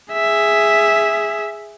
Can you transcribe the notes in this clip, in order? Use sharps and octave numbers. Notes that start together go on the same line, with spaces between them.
G#4 E5